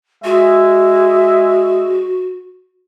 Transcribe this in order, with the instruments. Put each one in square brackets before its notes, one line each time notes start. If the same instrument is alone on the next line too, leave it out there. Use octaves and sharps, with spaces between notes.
[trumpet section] G#3 E5 [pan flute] F#4